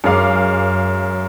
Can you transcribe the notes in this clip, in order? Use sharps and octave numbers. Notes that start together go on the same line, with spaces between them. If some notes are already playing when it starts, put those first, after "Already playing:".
F#2 G#3 F5 D6